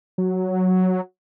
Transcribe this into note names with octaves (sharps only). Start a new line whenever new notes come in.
F#3